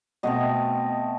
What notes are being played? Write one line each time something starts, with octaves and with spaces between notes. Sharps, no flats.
B2 A3 C4 D#5